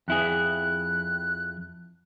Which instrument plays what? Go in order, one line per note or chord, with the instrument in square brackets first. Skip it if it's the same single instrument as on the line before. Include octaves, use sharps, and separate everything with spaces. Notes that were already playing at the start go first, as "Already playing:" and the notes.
[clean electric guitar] F2 E4 G#4 [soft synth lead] F#6